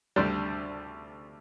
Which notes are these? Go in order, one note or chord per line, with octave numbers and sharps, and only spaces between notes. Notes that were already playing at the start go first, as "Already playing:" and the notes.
D2 D3 G3 D4